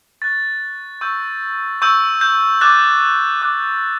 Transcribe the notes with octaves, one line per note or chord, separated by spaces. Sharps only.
C#6 F#6 A6
C#6 E6 G6
C#6 E6 G6
G6
D6 F#6 A6
D6 F#6